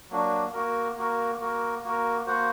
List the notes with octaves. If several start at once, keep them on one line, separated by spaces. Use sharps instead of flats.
F#3 A#3 D4 F#4
A#3 F#4 A#4
A#3 F#4 A#4
A#3 F#4 A#4
A#3 F#4 A#4
A#3 F#4 C5 F#5